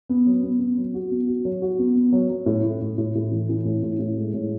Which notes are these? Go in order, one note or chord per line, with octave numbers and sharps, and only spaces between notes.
B3
F#3
B3
B3
F#3
F#4
B3
F#4
F#3
F#4
B3
B3
F#3
F#3
A2
A2
A2
A2
A2
E3
E3
A2
A2
A2
G#3
A2